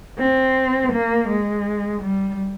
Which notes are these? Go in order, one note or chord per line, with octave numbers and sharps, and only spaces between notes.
C4
A#3
G#3
G3